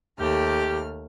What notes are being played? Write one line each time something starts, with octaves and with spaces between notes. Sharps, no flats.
D#2 A3 G4 F6